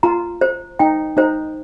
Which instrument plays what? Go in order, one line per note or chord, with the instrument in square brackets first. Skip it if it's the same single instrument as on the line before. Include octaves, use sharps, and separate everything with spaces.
[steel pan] F4 [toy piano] A#5
[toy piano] C5
[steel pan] D#4 [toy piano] G5
[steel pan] D#4 [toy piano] C5